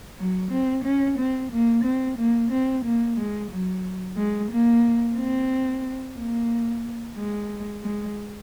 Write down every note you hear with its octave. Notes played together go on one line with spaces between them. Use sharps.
F#3
C4
C#4
C4
A#3
C4
A#3
C4
A#3
G#3
F#3
G#3
A#3
C4
A#3
G#3
G#3